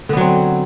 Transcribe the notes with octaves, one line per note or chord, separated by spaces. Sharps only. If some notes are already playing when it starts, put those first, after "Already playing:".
D3 F#3 B3 C4